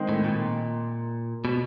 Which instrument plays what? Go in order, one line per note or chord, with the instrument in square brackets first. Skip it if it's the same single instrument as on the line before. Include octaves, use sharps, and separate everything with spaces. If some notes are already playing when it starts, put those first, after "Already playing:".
Already playing: [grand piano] D#3 G#3 C4
[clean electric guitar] A2
A#2
B2